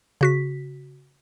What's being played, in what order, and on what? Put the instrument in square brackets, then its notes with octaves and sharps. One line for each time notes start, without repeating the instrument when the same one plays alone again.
[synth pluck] C#3 F#4 B6